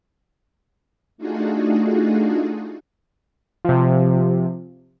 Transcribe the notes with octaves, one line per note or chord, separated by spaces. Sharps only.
A3 D4 D#4 F4 F#4 G#4
C3 F3